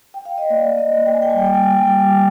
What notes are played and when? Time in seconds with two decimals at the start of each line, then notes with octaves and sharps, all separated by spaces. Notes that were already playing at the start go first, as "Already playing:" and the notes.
0.14 G5
0.25 F5
0.38 D#5
0.50 A#3 D5
0.78 D#5
0.92 A#3
1.06 G5
1.14 G#5
1.22 G5
1.30 G#5
1.34 G3 G5
1.46 G#5
1.54 G5
1.63 G#5
1.71 G5
1.76 G3 G#5
1.87 G5